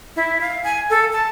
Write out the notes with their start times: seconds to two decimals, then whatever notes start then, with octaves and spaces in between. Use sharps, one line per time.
0.16 E4
0.41 F5
0.64 G#5
0.90 A4
1.13 A5